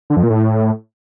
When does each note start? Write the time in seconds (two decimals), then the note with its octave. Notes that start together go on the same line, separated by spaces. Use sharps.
0.10 D3
0.17 F2
0.23 A#2
0.30 A2